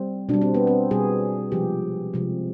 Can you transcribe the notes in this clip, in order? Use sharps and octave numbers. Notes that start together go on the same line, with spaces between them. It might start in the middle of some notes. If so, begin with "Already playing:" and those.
Already playing: G3 C4
B2 G3 D4
C4
B3
C4
B2 G3 G#4
C3 F3 G#3 G4
C3 F3 G#3